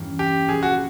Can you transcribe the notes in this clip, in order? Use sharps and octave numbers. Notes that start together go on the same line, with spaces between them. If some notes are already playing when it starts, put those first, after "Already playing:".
Already playing: E2 G2 E3 G3 A#3 C#4
G4
A#1 A#2 G3 G#4
F#4